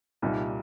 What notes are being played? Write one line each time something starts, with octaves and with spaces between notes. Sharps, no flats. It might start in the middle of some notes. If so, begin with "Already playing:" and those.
C2 A#2 G3 D#4